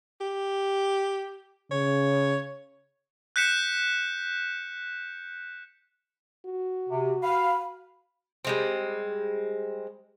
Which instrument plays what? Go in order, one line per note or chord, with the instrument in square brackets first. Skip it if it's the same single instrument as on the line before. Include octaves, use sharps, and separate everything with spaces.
[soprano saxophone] G4
[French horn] C#3 [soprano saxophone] C#5
[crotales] F#6 G6 B6 C#7 E7
[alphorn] F#4
[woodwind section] C3
[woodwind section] F5 [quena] B5
[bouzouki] G3 G#3 C4